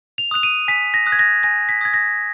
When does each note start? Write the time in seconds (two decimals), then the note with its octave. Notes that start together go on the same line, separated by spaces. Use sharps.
0.18 F7
0.31 D#6 F#6 F7
0.43 D#7
0.68 G#5 B6
0.94 A#6
1.06 D#6 F#6
1.12 G#6
1.19 A#6
1.43 G#5 A#6
1.69 B6
1.81 D#6 F#6 G#6
1.94 A#6